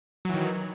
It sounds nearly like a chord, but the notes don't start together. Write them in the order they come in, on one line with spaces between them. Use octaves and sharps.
F#3 E3 D#3